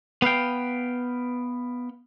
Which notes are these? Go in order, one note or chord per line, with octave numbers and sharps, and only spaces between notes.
B3 B4 F5 G5